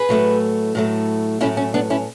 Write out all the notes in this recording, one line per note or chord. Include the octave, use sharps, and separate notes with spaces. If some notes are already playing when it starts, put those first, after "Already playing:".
Already playing: G#4 B4
A2 F#3 A3
A2 F#3 A3
A2 F#3 A3 C#4 E4
C#4
B3 D4
C#4 E4